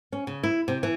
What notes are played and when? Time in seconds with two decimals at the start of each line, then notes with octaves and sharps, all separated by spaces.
0.12 C#4
0.27 C#3
0.43 E4
0.68 C3
0.83 E3